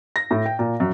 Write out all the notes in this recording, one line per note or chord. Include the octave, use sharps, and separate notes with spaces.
A#6
A2
G5
A#2
F#2